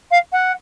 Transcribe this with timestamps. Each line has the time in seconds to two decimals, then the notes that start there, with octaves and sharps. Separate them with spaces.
0.11 F5
0.32 F#5